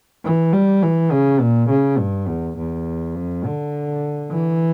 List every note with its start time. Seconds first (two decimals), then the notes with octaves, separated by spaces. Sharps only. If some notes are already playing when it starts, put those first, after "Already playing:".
0.24 E3
0.53 G3
0.82 E3
1.12 C#3
1.41 A#2
1.69 C#3
1.98 G2
2.28 E2
2.57 E2
3.15 F2
3.45 D3
4.31 E3